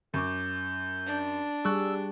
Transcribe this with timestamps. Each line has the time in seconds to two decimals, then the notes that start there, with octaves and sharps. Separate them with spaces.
0.14 F#2 C#6 D6 G6
1.07 D4
1.65 G3 G#4 C#6 E6 F#6